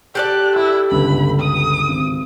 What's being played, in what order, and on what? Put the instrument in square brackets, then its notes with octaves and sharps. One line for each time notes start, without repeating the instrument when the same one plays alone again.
[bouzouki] G4 A4 D5 [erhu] F#6
[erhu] E4 [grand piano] E6
[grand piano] G1 C#2 [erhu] B5
[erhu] D#6
[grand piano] G#1